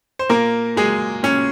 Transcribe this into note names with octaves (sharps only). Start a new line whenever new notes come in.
C5
A#2 A#3 A#4
F#3 G#3 G#4
A#2 C#4